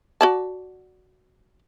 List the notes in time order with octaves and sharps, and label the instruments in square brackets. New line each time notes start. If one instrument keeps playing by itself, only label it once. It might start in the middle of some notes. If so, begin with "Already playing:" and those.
[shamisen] F#4 D5 A5